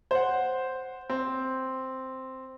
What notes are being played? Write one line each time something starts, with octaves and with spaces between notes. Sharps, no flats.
C5 F#5
C4